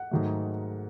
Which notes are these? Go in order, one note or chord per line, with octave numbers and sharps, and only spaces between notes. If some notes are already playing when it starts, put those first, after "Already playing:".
Already playing: F#5
G#2 D#3 F#3 A3